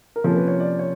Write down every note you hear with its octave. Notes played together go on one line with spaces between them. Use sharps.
A#4
C3 F3 A#3 C#4 A4
B4
C#5
D5
C#5